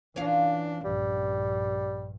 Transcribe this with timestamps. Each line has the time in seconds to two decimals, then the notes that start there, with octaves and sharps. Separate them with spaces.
0.16 E3 C#4 D4 F4
0.85 A#1 G2 G3